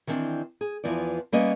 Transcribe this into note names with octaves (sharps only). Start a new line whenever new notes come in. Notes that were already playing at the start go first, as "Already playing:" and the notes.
D#3 E3 G3 C4 D4
G#4
E2 C3 E3 F3 B3 D5
G3 A#3 B3 C#4 B4 D#5